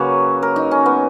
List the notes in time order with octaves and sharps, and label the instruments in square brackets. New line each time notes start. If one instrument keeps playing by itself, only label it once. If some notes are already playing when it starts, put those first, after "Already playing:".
Already playing: [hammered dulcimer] C#3 F#3 A#3 B4 C#5
A#4
D#4
C#4
B3